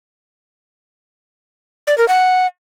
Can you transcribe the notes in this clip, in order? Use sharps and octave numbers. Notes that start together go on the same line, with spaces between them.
D5
A#4
F#5